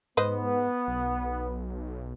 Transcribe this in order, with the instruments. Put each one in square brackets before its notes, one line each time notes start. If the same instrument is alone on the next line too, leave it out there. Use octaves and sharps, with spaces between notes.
[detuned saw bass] G#2 [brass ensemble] B3 [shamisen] B4 C5 D#5
[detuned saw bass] B1